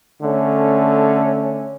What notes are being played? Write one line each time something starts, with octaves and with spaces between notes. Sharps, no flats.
D3 A3 C#4